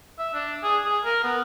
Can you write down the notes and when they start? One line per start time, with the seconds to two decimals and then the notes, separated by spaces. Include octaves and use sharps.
0.19 E5
0.34 D4
0.63 G#4
0.84 G#4
1.05 A#4
1.24 B3